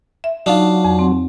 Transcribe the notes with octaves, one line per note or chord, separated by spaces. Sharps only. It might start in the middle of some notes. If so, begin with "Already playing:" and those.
E5
F#3 D4 D#4 F4 F5
F2
C4